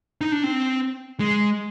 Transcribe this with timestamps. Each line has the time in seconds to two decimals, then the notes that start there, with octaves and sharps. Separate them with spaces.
0.21 D#4
0.32 D4
0.44 C4
1.20 G#3